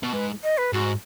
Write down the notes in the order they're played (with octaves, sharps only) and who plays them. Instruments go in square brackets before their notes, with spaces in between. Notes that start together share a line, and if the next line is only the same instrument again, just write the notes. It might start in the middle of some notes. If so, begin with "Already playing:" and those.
[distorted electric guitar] B2
[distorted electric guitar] G#2 [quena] B4
[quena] D#5
B4
[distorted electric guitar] G#2 [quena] F#4